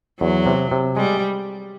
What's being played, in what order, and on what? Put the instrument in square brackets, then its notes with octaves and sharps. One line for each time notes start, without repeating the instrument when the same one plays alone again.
[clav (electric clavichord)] E2 [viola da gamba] F#3
[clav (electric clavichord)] C3
C3
[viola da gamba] G3 [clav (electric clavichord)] G#3